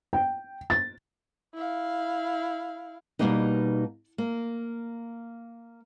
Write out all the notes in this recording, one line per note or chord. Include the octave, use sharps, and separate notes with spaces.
G5
A6
E4 F5
B2 E3 G3 A#3 B3 D#4
A#3